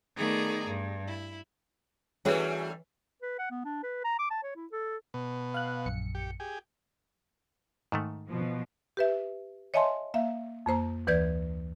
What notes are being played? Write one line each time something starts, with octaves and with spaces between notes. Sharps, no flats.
D#3 A3 B3 G#4 D5 A#5
G2
E4
E3 G3 A3 C#4 F#4 G#4 B4 C#5
B4
F#5
B3
D4
B4
A#5
D6
A5
C#5
E4
A4
B2
F5 F#6
A#1 F#2 C#7
G4
G4 G#4
G#2 D#3 A3
B2 F3
G4 B4 E5
C#5 D#5 E5 G#5 A5 C6
A#3 E5 F5
F2 A#3 C5 A#5
D2 E3 B4 D5 G6 G#6